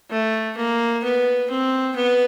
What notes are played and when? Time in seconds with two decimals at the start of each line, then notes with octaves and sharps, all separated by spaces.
0.10 A3
0.57 A#3
1.04 B3
1.50 C4
1.96 B3